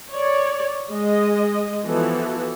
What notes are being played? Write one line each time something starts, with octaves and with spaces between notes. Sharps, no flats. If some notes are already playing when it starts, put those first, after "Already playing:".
C#5 D5
G#3 D#5
E3 F3 B3 F#4 A4